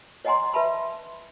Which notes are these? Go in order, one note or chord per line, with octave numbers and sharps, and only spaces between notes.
C#5 D#5 F#5 G#5 A#5 C6
B4 E5 A5 B5 C6